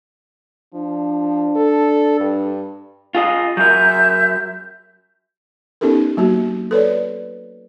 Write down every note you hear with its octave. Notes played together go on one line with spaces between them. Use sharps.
F3 D4
A4
G2
F4 G#4 D#5
F#3 G#4 A#4 E5 G6
B3 C#4 D#4 G4 A4 A#4
F#3 A#3 F#4
A4 B4 C#5 D5